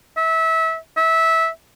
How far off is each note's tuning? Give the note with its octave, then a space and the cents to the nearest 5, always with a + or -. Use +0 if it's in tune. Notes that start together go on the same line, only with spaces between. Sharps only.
E5 -25
E5 -20